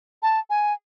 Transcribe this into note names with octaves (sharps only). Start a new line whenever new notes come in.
A5
G#5